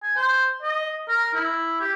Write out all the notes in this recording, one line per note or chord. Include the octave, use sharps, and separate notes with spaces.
G#5
C5
D#5
A#4
E4
G4